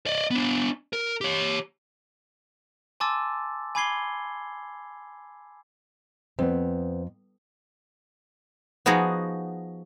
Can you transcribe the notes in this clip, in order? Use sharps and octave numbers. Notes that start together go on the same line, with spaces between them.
D5 D#5
B3 D4
A#4
G4 C#5
G#5 A5 C6 D6 E6 A6
G#5 B5 D6 G#6 C7 G7
F2 B3 C4
F3 B3 D#4 F#4 G#4